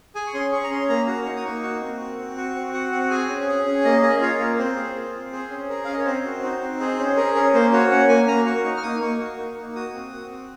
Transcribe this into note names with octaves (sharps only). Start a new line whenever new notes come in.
G#4 G#5
C#6
C#4 C6
G#4 C#6
A#5
C#4 C6
A#3 A#5
F#4 A#5
D#4 C#6
D#6
A#3 C#6
F#4 C#6
C4
F#4
C4
F#4 C#6
C4
F#4 F#5
C4
G#4 G#5
C#4
G#4
C#4
A#3 D#5
G#4 D#5
F4 C#5
A#3 A#4
C4 C5
G#4
F4
C4
G#4 C5
C#4
G#4 A#4
F5
C#4 D#5
C#5
C4 C5
F#4
D#4 C5
C4
G#4 C5
C#4 C5
G#4 A#4
C#4 A#4
A#3 C5
F#4 C#5
C#4 F#5
A#3 G#5
A#3 A#5
F#4 C#6
D#4 C#6
F6
A#3 D#6
A#3 C#6
F#4
D#4
A#3
F#4 D#6
C4
F#4
C4